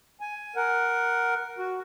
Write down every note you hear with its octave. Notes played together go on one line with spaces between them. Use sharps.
G#5
A#4 F#5
F#4